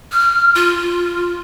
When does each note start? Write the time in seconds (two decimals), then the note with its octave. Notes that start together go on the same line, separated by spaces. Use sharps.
0.12 F6
0.55 F4